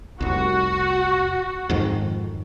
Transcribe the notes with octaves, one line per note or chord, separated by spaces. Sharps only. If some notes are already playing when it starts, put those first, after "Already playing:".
F1 C2 F#4
F2 G#2 D#3